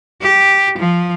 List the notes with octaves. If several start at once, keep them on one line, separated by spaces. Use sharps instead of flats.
G4
F3